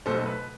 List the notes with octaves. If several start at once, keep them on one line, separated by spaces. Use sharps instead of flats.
B1 B2 A3 A4 C5
B4